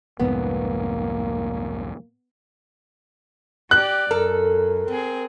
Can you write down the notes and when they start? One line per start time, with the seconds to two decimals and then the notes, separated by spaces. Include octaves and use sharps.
0.20 C2 F2 G#2 A#3 B3
3.71 G4 D5 F#6
4.11 F#2 A4 A#4
4.89 C4 G#4